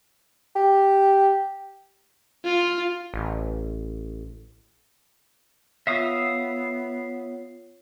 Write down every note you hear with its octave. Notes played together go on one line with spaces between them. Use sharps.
G4
F4
A1
B3 F4 C#5 E5 F5 D#6